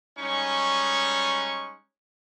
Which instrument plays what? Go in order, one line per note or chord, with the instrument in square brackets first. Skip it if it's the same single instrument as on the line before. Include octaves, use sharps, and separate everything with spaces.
[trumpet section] G3 G#3 C#4 D#4 C#6